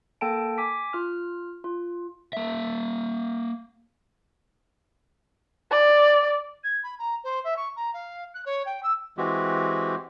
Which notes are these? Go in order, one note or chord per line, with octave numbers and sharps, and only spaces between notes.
A#3 A4 G5 A5 D7
G#5 D6 B6
F4 F6
F4
A#3 E5
D5
G#6
B5
A#5
C5
E5
C#6
A#5
F5
F#6
C#5
G5
E6
E3 G#3 C4 F#4 G4